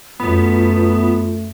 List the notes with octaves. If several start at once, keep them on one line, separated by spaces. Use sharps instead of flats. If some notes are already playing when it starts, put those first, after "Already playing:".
F#2 A3 B3 F4